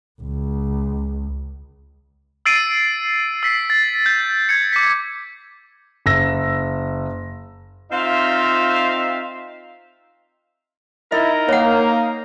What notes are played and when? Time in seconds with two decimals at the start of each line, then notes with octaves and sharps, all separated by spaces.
0.22 C#2
2.46 E6 A6 C7 D7 D#7
3.43 E6 B6 C7
3.70 A6
4.06 G6
4.49 G#6 C#7
4.73 D6 B6
6.06 F#1 E6 A#6
7.92 C4 D#4 F4 E5 F5
11.12 D#4 E4 A#4 D#5
11.49 A#3 C#5 F5 F#5